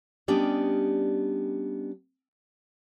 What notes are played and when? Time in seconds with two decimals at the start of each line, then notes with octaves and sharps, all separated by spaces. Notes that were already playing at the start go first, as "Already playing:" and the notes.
0.28 G3 B3 C#4 D4 G4 D#5